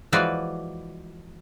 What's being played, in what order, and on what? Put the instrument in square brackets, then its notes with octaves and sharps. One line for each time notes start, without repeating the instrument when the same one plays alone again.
[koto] E3 F3 G#3 F#4 B4 D5